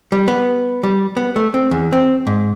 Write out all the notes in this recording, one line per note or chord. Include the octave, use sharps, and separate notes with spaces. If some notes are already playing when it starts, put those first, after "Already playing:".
G3
B3
G3
B3
A3
C4
E2
C4
G#2